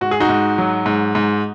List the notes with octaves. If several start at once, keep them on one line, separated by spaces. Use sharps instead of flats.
G#2 F#4
G#4
D#4 F#4
G#2
F#3
G#2
G#2